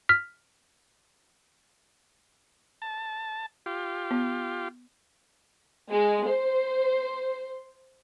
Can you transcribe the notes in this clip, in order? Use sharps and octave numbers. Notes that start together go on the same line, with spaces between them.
F6 B6
A5
F4 G4
B3
G#3
C5